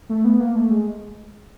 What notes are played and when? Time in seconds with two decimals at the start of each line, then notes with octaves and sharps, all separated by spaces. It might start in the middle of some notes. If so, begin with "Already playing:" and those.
0.09 A3
0.25 B3
0.40 A#3
0.56 A3
0.71 G#3